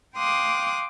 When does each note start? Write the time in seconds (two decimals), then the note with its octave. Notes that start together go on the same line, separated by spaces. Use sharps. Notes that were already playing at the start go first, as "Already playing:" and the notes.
0.16 F5 G5 C6 D6 D#6 F#6